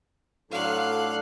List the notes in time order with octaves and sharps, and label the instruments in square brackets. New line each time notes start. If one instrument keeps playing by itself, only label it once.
[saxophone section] A2 F4 A4 [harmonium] F#3 D4 [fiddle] F5 F#6